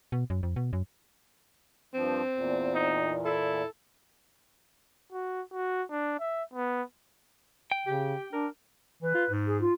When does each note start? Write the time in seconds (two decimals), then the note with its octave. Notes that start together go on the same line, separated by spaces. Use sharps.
0.12 B2
0.30 F#2
0.43 F2
0.56 B2
0.73 F#2
1.94 G2 F3 C4
2.33 E2 A#2
2.74 D#4
3.25 E4 A4
5.12 F#4
5.52 F#4
5.90 D4
6.20 E5
6.53 B3
7.72 G5
7.87 C#3 G4
8.33 D4 A#4
9.02 E3 B4
9.15 F4
9.31 G#2
9.46 G#4
9.60 F4